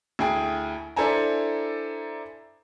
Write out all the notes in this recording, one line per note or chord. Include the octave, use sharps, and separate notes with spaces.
D2 E4 G#4 G5 G#5
D4 E4 A4 C5 G#5 A#5